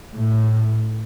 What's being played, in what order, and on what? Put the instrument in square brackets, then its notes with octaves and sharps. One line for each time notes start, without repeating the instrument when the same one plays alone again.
[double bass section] A2